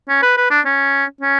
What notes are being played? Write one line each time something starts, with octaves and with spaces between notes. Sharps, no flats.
C#4
B4
B4
D4
C#4
C#4